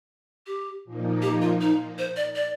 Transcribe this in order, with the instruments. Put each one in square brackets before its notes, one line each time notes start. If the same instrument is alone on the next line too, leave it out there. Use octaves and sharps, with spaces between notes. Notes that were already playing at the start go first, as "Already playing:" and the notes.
[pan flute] G4
[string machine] A#2 F3 A#3 D#4
[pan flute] G4
F4
D#4
C5
D5
D5